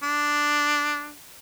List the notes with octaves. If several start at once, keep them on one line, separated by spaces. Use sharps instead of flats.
D4